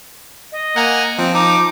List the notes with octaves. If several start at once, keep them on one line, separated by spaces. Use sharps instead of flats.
D#5
A#3 F#5 G#5 A#5
F3 C4
D#4 D6